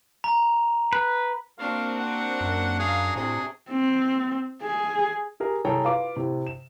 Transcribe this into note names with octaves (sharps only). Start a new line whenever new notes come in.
A#5
B4
A#3 C4 D4 F#4 F5
F#5
F#2
G#4 F5 A#5
A2 C3 G#4
C4
G#4
G4 G#4 A#4
C2 G#4 A4 C#5 G5 A#5
F4 B4 F5 D6
A2 C3
E7